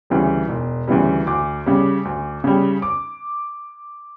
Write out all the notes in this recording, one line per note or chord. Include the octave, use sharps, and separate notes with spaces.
D2 C#3 E3 G3
E1
D2 C#3 E3 G3
D2 D6
C#3 G3
D2
C#3 G3
D6